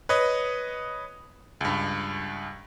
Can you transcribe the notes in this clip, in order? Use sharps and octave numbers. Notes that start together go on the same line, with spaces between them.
B4 C#5 D#5
C#2 G2